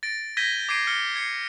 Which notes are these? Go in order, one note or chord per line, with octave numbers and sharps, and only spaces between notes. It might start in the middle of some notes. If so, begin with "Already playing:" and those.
A6 A#6 D7
G6 G#6 A#6 B6 D#7 G7
D6 G#6 B6 C7 D7 D#7
F6 C#7 G7
G#6 C7 C#7